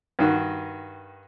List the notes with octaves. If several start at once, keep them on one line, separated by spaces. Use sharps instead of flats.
G2 D#3 F#4